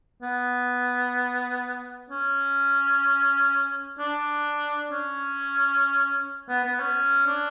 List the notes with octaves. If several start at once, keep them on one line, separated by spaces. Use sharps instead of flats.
B3
C#4
D4
C#4
B3
B3
C#4
D4